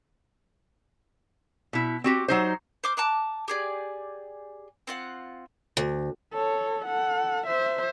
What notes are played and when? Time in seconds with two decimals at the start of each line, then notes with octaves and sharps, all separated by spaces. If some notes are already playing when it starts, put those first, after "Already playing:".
1.73 B2 E4
2.04 C4 F#4 G4
2.28 F#3 D#4 C5
2.84 C5 D6 F6
2.97 A5 A#5 D6 F#6
3.48 G4 G#4 D5
4.87 C4 F4 F#5
5.77 D2
6.33 A4 C#5
6.86 A4 F#5
7.47 C5 E5